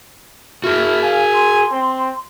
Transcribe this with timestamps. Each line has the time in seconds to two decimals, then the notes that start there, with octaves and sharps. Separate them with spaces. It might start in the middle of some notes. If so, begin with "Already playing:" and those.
0.64 E4 F#4 G#4 F6
1.02 F5 G#5
1.33 C6
1.72 C4